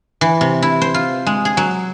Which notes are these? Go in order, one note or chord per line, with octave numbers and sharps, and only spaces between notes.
E3
C3
E4
C5
F4
G#3
G#4
F#3